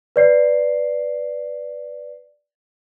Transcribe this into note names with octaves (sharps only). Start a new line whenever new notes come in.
B4 D5 C7